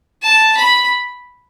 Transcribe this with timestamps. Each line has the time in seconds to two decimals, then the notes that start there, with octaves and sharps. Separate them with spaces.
0.23 A5
0.57 B5